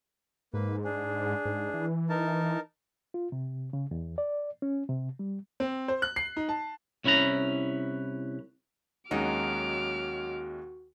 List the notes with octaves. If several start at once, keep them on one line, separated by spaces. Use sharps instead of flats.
G#2 A#3 B4
D4 G#4
G#2
E3
D#4 A#4 A5
F4
C3
C#3
E2
D5
C#4
C3
G3
C4
C5
F#6
C7
D#4
A5
C2 C#4 E4 B4 A#5
D#2 F#3 G#3 C#4 D#4 F#4 D6 F6